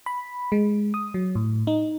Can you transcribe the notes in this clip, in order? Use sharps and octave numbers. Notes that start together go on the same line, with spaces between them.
B5
G#3
D#6
F#3
A2
D#4